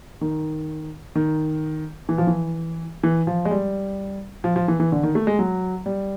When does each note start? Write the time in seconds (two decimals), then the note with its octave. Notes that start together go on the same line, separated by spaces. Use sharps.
0.21 D#3
1.15 D#3
2.09 E3
2.18 F3
2.27 E3
3.03 E3
3.27 F3
3.45 G#3
3.51 G3
4.44 F3
4.56 F3
4.68 E3
4.80 E3
4.92 D3
5.03 D#3
5.15 A3
5.27 G#3
5.39 F#3
5.86 G3